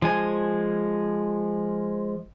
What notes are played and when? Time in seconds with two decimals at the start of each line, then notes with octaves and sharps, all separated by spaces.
0.02 F3 G#3 G#5